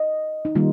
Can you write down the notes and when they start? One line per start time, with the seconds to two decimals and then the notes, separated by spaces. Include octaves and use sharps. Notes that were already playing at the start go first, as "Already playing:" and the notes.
Already playing: D#5
0.45 D#4
0.55 D#3 G3 A#3 F4